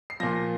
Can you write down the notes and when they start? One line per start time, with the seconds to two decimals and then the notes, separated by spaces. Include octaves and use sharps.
0.10 C7
0.20 A#2 F3 A#6